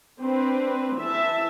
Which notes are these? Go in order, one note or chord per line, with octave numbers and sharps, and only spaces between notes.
C4 D4 B4
E3 E5 A5